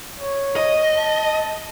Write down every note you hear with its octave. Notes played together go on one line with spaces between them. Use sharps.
C#5
D#5
A5